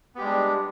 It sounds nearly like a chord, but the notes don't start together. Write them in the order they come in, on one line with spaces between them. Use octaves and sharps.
B3 G4 G#3 G3 D4